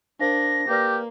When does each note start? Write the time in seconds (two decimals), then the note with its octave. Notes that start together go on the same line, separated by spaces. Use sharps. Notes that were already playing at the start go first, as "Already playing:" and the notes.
0.20 D4 A#4 C5 F5 A#6
0.69 A#3 G4 B4 D5 F6